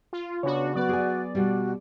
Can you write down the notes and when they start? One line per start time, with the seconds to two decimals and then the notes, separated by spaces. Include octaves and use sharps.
0.13 F4
0.43 C#3 B3 D4 F#4 C#5
0.75 F#3 B3 F#4 B4 D5
0.89 G#4 G#5
1.35 B2 G3 F#4